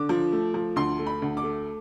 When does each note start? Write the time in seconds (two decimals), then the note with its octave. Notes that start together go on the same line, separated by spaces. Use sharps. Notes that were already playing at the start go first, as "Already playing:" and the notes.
Already playing: D3 D6
0.09 F3
0.32 A3
0.54 F3
0.76 D2 C6
0.99 A3
1.07 B5
1.22 D2
1.37 D6
1.44 A3